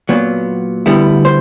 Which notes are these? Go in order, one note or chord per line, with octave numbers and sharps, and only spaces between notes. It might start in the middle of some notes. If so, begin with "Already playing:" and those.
A#2 F#3 B3
D2 D3 G3 B3 E4
C5